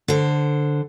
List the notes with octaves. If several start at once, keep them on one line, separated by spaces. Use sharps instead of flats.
D3 C5